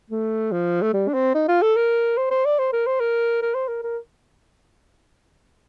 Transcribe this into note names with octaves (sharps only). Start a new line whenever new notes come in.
A3
F3
A3
G3
D4
C4
D#4
F4
A4
A#4
C5
C5
D5
C5
A#4
C5
A#4
A#4
C5
A#4
A#4